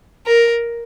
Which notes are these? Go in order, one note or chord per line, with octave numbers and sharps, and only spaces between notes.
A#4